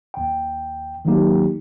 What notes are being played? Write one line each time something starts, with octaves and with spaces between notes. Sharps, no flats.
D#2 G5
D#3 F#3 A#3 D#4 G4